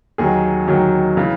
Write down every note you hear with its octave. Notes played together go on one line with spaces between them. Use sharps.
D#2 D#3 F#3 G#4
D#2 D#3 F#3
C#3 E3